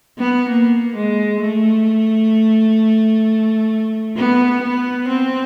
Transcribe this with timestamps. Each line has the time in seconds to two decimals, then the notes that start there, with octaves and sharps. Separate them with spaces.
0.18 B3
0.49 A#3
0.95 G#3
1.41 A3
4.16 B3
4.62 B3
5.08 C4